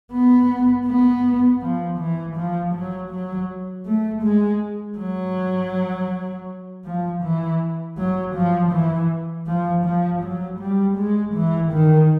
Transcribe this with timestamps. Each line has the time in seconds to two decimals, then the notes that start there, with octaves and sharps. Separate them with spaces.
0.12 B3
0.87 B3
1.62 F3
1.99 E3
2.36 F3
2.74 F#3
3.11 F#3
3.86 A3
4.23 G#3
4.98 F#3
6.85 F3
7.23 E3
7.98 F#3
8.35 F3
8.72 E3
9.47 F3
9.85 F3
10.23 F#3
10.59 G3
10.97 G#3
11.34 E3
11.72 D#3